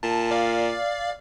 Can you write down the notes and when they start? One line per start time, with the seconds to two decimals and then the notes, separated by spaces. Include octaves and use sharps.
0.03 A#2 A5
0.31 D5 F5